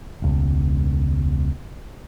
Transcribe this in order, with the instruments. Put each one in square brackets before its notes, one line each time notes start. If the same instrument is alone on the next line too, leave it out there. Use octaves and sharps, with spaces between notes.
[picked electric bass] E1 C#2